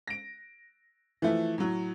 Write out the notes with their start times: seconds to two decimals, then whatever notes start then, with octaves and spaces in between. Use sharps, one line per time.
0.07 A#6 D7
1.22 E3 F3 A3
1.58 A2 F#3